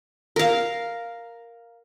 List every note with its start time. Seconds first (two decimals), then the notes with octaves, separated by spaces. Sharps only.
0.36 A#4 F5